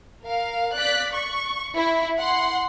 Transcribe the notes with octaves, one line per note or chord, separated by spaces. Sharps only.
A#4 F5
D5 F#6 B6
C#6
E4
F#5 C6